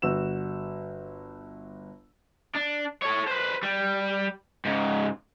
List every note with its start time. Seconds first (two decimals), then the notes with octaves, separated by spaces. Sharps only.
0.02 G1 F#4 E6 E7
2.55 D4
3.02 A4 C#5
3.28 B4 C5
3.63 G3
4.65 G#2 C#3